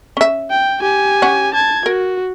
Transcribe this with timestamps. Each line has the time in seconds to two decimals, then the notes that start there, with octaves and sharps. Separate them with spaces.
0.17 C#4 E5
0.50 G5
0.81 G4 G#5
1.22 C#4 F#5
1.54 A5 G#6
1.86 F#4 A#4